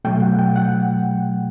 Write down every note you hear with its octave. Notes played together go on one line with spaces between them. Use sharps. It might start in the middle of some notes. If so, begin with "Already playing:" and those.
B2 F#3 A3 G5
F#5
G5
F#5